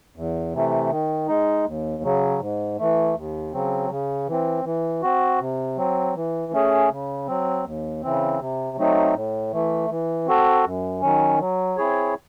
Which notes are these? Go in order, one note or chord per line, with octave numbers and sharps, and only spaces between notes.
E2
C3 E3 A3
D#3
G#3 D#4
D#2
C#3 F#3
G#2
E3 A3
D#2
C#3 F#3 C4
C#3
E3 C4
E3
C4 F#4
C3
F#3 C4
E3
A3 C#4 G#4
C#3
F#3 C4
D#2
C#3 E3 C4
C3
F#3 A3 C4 D#4
A2
E3 A3
E3
C4 F#4 A4
F#2
D#3 F#3 C#4
F#3
C4 E4 G#4 C#5